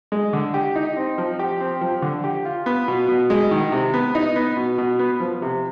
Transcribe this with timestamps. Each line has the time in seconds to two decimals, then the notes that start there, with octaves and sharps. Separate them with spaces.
0.12 G#3
0.33 D3
0.54 G4
0.76 D#4
0.97 C4
1.18 F3
1.39 G4
1.60 C4
1.81 F3
2.02 D3
2.24 G4
2.45 F4
2.66 B3
2.88 B2
3.08 B2
3.30 G#3
3.51 D#3
3.72 C3
3.94 B3
4.15 D#4
4.36 B3
4.57 B2
4.78 B2
4.99 B3
5.20 F3
5.42 C3